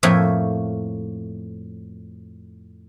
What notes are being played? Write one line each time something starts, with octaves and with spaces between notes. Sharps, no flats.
F2 A2 F3 A#3 C#5 E5